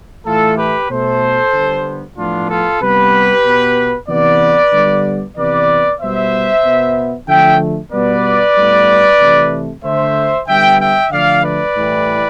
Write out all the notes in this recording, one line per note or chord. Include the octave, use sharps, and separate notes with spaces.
A2 E3 A3 F4 A4
G4 B4
B2 A3 A4 C5
D3 G3 B3
A2 F3 B3 D4 F4
F4 A4
C3 G3 B3 G4 B4
B2 B3
C3 E3 B3 B4 D5
D3 G3 B3
C3 E3 B3 B4 D5
B2 G3 B3 C5 E5
B2 B3
D3 F3 A3 E5 G5
B2 G3 B3 B4 D5
A2 G3 B3
C3 E3 A3
D3 A3 C5 E5
D3 G3 B3 E5 G5
E5 G5
D3 F3 A3 D5 F5
B4 D5
A2 E3 G3